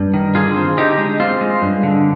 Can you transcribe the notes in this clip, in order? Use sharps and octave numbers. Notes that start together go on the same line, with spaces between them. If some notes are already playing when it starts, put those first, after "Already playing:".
Already playing: G2
D#3
D3 F4 G#4
C4
D3 D#4 G4
G#3
C4 F4
G#3
G2
D3